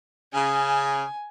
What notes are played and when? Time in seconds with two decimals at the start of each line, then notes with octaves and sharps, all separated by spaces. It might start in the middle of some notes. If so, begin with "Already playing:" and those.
0.33 C#3 G#5